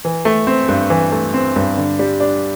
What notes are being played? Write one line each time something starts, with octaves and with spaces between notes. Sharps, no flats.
E3
A3
C4
G2
E3
A3
C4
G2
D3
G3
D4